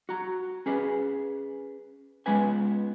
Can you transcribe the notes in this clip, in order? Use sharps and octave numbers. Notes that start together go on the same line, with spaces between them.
F#4 A#5
C#4 G#4 B4
G#3 B3 C#4 F4 B4 G#5